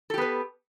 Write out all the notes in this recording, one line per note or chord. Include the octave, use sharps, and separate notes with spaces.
B3 G4 A4 B4